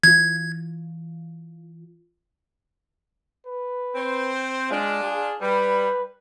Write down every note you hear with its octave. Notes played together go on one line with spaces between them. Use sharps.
E3 F4 G#6
B4
C4 C5
G#3 D4 F4
G#4
G3 B4